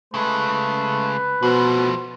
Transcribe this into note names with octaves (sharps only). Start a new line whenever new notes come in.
C#3 G#3 A3 B4
B2 F3 A3 C5